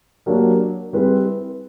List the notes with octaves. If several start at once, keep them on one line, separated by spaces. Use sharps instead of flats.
F#3 A#3 D4 G4 A#4
G3 C4 E4 G#4 B4